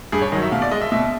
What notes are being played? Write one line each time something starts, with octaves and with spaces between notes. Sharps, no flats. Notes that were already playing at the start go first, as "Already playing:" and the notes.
G2 G#4
C#5
D#3 F#3 D#5
E5
B2 F5
D5
G#3 D#5
E5
B2 E5